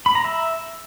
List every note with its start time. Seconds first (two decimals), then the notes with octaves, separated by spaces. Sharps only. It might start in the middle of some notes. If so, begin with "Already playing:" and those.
0.06 B5
0.15 A#5
0.25 E5